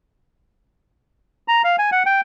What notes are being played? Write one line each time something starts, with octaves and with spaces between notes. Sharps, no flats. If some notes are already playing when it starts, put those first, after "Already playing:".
A#5
F5
G#5
F#5
G5